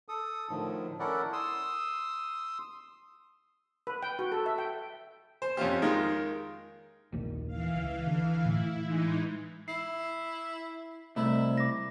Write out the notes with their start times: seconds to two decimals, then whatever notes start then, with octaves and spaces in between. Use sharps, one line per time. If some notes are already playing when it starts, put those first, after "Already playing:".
0.08 A4 D#6
0.49 A2 D3 D#3 F3
0.99 C#4 E4 A4 A#4 D5 F#5
1.33 C6 D#6 E6
3.87 B4
4.03 G5
4.19 F#4
4.32 A4
4.46 E5
4.58 G5
5.42 C5
5.57 F2 C#4 F4 G4
5.82 D#3 G#3 F4 A#4
7.12 A#1 D#2 D#3
7.47 E3 F5
7.75 C#2
8.07 D3
8.45 A2 E4
8.83 E3 G#3 D#4
9.68 E4 C7
11.16 C2 A3 E4
11.58 D6 A#6